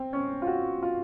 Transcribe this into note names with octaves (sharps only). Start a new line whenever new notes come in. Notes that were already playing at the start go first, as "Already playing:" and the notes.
Already playing: C4
C#4
F4
F#4
F4